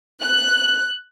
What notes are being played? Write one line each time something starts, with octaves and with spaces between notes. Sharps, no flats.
F#6